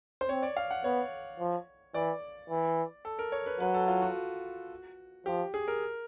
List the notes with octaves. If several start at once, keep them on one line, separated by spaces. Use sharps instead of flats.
C5
C4 C#5
D5
F5
F#5
B3 C#5
F3
E3 D5
E3
A4
A#4
C#5
B4
F#3 B4
A4
F4
F#4
F3 G4
G#4
A#4